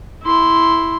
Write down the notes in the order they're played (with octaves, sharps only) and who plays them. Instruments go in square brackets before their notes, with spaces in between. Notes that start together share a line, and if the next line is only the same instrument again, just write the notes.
[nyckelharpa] E4 C6